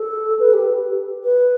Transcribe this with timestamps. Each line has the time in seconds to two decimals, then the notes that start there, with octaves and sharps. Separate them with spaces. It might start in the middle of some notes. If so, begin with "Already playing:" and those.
Already playing: A4
0.39 B4
0.53 G4
1.24 B4